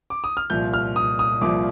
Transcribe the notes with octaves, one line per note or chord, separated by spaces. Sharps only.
D6
D#6
F6
C2 A#2 F3 G6
F6
D#6
D#6
C2 A#2 F3 D6